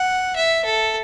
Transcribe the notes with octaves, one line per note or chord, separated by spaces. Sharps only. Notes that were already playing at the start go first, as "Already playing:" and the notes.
Already playing: F#5
E5
A4